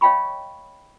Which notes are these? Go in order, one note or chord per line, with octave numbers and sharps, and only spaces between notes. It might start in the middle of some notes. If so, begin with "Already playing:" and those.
C#5 D#5 F5 G5 B5 C#6